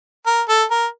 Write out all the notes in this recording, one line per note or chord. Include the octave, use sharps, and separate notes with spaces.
A#4
A4
A#4